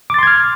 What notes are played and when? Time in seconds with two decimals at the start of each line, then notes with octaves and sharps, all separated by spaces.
0.10 D6
0.14 A6
0.19 C6
0.23 G#6
0.27 F6